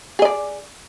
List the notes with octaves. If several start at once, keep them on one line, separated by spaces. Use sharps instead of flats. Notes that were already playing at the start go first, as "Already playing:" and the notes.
G#4 D5 D#5